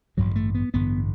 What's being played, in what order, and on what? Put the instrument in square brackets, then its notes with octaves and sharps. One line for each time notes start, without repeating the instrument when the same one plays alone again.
[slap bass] A1 G2 D3 F#3
A3
B3
A1 G2 D3 B3